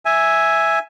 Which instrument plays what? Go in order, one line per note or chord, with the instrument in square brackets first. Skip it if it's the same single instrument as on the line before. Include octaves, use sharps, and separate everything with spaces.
[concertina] E5 G#5